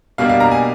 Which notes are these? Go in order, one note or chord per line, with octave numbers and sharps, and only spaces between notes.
B2 G3 A#3 D4 F5
F5
A#5
G#5